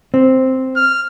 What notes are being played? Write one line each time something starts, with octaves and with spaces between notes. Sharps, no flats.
C4
F6